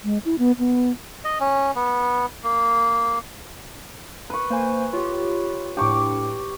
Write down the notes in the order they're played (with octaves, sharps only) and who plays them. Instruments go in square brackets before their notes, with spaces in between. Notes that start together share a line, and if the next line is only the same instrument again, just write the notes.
[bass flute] G#3
E4
B3
B3
[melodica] D#5
C#4
B3
A#3
[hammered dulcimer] B4 C#6
[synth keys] A#3 C5 G#5
[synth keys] F4 G4 [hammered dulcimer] C#5
[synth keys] A2 D4 [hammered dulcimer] G4 C#6 D6